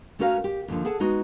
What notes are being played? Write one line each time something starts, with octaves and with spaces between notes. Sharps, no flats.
A3 C#4 F#4 A#4 C5 F5
G4
D#2 D3 F3
G#4 A4 F#5 A5
G#3 B3 D#4 F#4